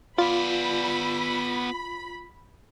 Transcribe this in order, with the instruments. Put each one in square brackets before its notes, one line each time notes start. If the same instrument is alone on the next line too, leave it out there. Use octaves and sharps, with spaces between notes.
[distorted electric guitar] B3 D5 [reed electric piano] F4 [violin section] B5